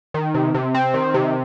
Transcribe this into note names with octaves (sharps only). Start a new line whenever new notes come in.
D#3
C3
C3
C4
D#3
C3